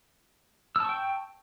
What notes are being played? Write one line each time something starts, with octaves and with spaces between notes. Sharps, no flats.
G5 A5 C#6 E6